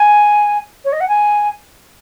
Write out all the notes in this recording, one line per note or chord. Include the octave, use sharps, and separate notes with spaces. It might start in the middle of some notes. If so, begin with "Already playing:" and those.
Already playing: G#5
C#5
D#5
F#5
G#5